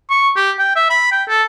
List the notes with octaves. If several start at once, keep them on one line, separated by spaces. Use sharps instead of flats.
C#6
G4
G5
E5
B5
G5
A4